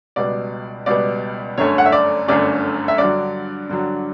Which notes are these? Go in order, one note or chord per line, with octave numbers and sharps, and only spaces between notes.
C#2 B2 G3 B3 D5
C#2 B2 G3 B3 D5
G1 F#2 D3 A3 C#4 C#5
F#5
E5
D5
G1 F#2 D3 A3 C#4 D5
E5
G2 D3 F#3 D5
G2 D3 F#3